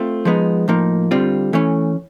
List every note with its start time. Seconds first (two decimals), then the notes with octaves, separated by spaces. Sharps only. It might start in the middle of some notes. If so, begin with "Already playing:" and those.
Already playing: A3 C4 F4
0.25 F3 G#3 B3 D#4
0.68 A2 F3 A#3 D#4
1.11 D3 G3 C4 F4
1.53 E3 A3 C#4